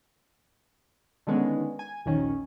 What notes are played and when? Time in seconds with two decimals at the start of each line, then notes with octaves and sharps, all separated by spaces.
1.27 D3 D#3 G#3 B3 C#4
1.79 G#5
2.06 A#1 D#2 D#3 C#4